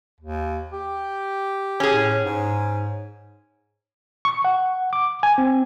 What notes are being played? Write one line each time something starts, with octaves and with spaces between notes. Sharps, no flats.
D#2
G4
C#4 G#4
A2
G#2
C#6
F#5
D6
G#5
C4